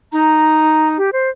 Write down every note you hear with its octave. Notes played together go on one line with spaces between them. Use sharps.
D#4 A#5
G4
C5